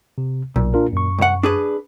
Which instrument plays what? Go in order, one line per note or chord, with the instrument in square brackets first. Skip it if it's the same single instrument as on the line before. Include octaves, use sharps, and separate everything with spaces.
[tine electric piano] C3
[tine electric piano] B1 [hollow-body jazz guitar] A#2
[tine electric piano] D4 F4 A#4
F#2 C#6
[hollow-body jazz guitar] C2 F#5
D4 G#4 B4